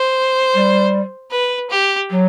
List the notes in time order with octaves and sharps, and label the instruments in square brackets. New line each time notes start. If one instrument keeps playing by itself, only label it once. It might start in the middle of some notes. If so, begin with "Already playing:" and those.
Already playing: [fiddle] C5
[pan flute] G3
[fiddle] B4
G4
[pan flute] F#3